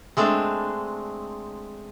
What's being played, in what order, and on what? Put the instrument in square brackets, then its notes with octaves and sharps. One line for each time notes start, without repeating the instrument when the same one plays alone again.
[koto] G#3 A3 C4 D4